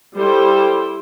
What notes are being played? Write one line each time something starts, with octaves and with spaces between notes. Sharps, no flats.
G3 E4 A4 C5 G5